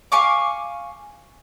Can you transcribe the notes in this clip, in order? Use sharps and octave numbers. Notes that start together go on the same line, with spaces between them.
F5 G#5 C#6 D6